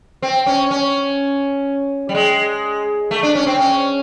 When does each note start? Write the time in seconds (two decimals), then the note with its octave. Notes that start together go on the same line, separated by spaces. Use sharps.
0.22 C4
0.46 C#4
0.71 C#4
2.09 G3
2.14 G#3
3.11 A3
3.23 D4
3.35 C#4
3.47 C4
3.59 C#4